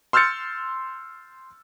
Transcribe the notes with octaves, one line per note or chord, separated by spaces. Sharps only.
C6 E6 F6 G6 A6 C#7